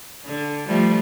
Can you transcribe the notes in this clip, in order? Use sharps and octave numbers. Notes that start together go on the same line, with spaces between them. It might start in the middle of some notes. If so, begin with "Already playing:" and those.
D3
F3 G3 A3